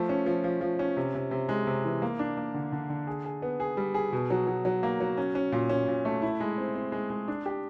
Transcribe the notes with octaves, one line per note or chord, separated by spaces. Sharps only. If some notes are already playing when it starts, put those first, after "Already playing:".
Already playing: F3 A3
C#4
F3
F3
F3
C#4
C3
C3
C3
G#3
C3
E3
A#3
D4
A#3
D3
D3
D3
G#4
G#4
B3
G#4
G3
G#4
B2
F#3
F#3
F#3
A#3
F#3
C#4
C#4
A#2
C#4
A#2
A3
E4
G#3
C4
C4
G#3
G#3
D4
G4